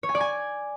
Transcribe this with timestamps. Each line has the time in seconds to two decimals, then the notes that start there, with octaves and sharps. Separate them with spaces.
0.03 C#5
0.09 G#5
0.15 D5
0.20 G#5